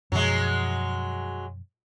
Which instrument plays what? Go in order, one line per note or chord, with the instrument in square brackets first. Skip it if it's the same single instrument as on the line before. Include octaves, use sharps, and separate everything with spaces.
[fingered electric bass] F#2 B2 F3 [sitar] F#3 G#3